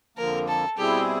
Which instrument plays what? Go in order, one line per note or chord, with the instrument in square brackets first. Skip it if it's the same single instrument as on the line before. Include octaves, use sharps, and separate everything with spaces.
[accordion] F2 D3 F3 A#3 [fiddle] A#4
[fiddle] A4
[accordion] B2 G3 C4 E4 G#4 [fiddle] G4